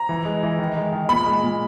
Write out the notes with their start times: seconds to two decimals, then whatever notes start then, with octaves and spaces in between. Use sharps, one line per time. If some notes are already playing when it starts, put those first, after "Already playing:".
Already playing: A#5
0.09 E3
0.25 G#3
0.43 E3
0.59 D#3
0.76 G#3
0.93 D#3
1.09 A#2 B5
1.26 G#3
1.43 A#2